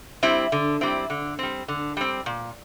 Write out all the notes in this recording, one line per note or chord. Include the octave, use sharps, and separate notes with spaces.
G3 C4 E4
D3
G3 C4 E4
D3
G3 C4
D3
G3 C4
A#2